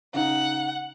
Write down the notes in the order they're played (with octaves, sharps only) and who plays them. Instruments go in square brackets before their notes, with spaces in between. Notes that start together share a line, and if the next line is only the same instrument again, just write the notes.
[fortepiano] C#3 D#4 [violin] F#5